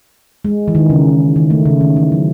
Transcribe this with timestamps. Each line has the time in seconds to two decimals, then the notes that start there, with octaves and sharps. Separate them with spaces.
0.45 G#3
0.68 E3
0.75 D#3
0.90 C#3
1.36 D#3
1.50 A3
1.66 C#3
1.81 D#3
1.97 E3
2.12 F#3